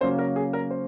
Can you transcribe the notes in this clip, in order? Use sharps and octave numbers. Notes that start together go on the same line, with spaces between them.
C#3 F#3 A#3 C#4 C5
A#4
G#4
A#4
C5